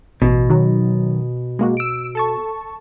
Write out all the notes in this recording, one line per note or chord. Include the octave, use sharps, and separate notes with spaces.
A1 B2
D#3 F#3
G#3 A#3 F#4
E6 D7
A4 A5 C#6